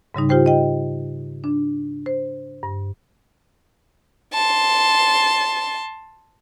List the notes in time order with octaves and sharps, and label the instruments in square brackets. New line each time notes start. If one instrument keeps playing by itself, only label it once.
[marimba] G#2 C#3 G3 D#4
F4 G4 C5 G5
D#5 G5
D4
C5
G2
[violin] A5 C6